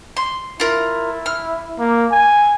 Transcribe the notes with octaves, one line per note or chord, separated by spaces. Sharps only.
C6
E4 F4 A#4
F6
A#3
G#5